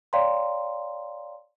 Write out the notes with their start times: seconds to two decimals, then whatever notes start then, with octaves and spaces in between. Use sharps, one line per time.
0.13 C#5 D5 F5 G5 A#5 C6